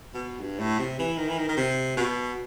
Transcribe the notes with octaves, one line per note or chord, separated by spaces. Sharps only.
B2
G2
A2
C3
E3
D#3
E3
D#3
D#3
C3
B2